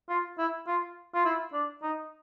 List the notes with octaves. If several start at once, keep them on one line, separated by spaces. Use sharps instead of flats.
F4
E4
F4
F4
E4
D4
D#4